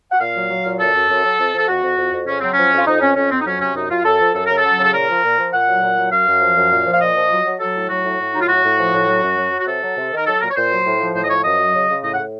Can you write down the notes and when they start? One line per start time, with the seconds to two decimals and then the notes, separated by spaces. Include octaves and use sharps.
0.12 F#5
0.20 A#2 F5
0.36 F#3
0.50 F#3
0.65 A#2
0.80 F#2 A4
0.94 F#2
1.09 F#2
1.24 F#3
1.39 F2
1.53 F3 A4
1.68 F2 F#4
1.83 F2
1.98 F2
2.13 F2
2.27 C#3 C#4
2.40 F#3 C4
2.53 F3 C#4
2.73 F2
2.78 F4
2.87 F2 D#4
3.01 F2 C#4
3.16 F2 C#4
3.31 F2 C4
3.40 D#4
3.46 F#3 C#4
3.60 C3 C#4
3.75 F#2 D#4
3.90 F#2 F4
4.05 F#2 A4
4.20 F3
4.34 F#2 A4
4.46 C#3 A#4
4.58 A4
4.65 F#3
4.80 C#3 A4
4.94 A#2 A#4
5.09 F3
5.23 A#2
5.38 F3
5.53 A#2 F#5
5.68 F#3
5.82 A#2
5.98 F#3
6.12 F#2 F5
6.27 F#2
6.41 F3
6.57 F#2
6.72 A#2
6.86 F3
6.93 F5
7.01 A#2 D#5
7.17 F3
7.31 F#3
7.46 F#3
7.60 F#3 A4
7.75 A2
7.90 F#3 F#4
8.04 A2
8.20 A2
8.34 F#3 D#4
8.41 F4
8.48 A2 F#4
8.64 A2
8.79 F3
8.93 A2
9.08 F#3
9.22 F#2
9.38 F#3
9.52 F#3
9.59 F#4
9.67 C3 A4
9.83 F#3
9.98 C3
10.12 D#3
10.17 A#4
10.26 F#3 A4
10.41 A#2 A#4
10.50 C#5
10.56 A#2 C5
10.72 F#3
10.86 A2
11.00 F3
11.15 A2 C5
11.24 D#5
11.30 F3 C#5
11.44 F#2 D#5
11.60 F#3
11.74 C#3
11.89 C#3
12.04 A2 D#5
12.14 F#5
12.19 A2